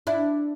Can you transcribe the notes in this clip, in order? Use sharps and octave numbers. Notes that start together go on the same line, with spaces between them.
D4 E4